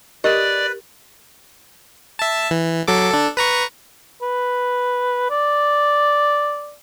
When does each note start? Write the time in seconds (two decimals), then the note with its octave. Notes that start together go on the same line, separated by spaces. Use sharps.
0.24 G4 A#4 B4 D5 D#5
2.19 E5 A5
2.51 E3
2.87 F#3 A4 D6
3.11 D4 A4
3.37 B4 A#5 C#6
4.22 B4
5.30 D5